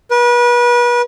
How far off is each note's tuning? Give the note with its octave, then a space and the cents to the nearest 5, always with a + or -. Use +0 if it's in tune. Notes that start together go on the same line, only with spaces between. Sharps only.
B4 -35